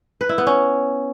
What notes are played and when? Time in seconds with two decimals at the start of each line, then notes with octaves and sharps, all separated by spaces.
0.21 B4
0.29 E4
0.38 B3
0.47 C#4